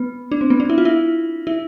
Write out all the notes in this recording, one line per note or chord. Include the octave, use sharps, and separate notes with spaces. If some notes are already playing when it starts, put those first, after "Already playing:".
Already playing: B3
D4
C4
B3
D4
E4
F4
E4
E4